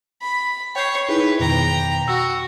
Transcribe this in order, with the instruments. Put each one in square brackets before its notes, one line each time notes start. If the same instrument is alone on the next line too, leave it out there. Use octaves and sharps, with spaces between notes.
[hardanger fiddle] B5
[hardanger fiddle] C#5 [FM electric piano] G5 G6 C7
[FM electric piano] D#4 E4 G#4 [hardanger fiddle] B4
[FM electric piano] F2 B2 D#3 [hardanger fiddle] G5 A#5
[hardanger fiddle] F#4 [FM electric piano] E6